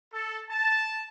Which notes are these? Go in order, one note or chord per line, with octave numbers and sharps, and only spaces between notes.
A4
A5